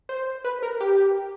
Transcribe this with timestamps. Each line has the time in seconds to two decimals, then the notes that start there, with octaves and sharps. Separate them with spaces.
0.09 C5
0.44 B4
0.62 A#4
0.80 G4